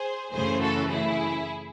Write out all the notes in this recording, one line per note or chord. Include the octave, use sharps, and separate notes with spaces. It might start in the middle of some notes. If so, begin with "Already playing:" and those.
Already playing: G#4 C5
F#2 C#3 E3 A3 G#4 C5
F#4 A4
E4 G#4